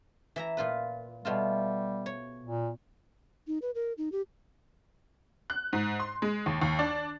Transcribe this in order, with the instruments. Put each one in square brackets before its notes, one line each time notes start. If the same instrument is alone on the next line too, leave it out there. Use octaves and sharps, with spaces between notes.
[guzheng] E3 E5 A#5
A#2 F4 B4
[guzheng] B2 A3 F4 [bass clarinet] G3
[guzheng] C#5
[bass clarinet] A#2
[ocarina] D#4
B4
A#4
D#4
G4
[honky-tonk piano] F#6
G#2
C6
G#3
D#2
D#2
D4